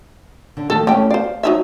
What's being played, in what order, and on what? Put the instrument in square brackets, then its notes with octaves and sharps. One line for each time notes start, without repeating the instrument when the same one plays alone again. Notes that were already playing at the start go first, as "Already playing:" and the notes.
[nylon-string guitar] D3
[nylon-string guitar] D#3 F3 A3 [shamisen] A4
[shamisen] E3 G5 [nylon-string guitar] A3 C#4
[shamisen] C5 D5 [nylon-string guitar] F5
[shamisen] F#3 D#4 E5